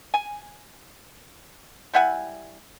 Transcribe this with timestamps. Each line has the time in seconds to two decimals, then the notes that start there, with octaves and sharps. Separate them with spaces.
0.14 G#5
1.94 G3 E4 F#5 G#5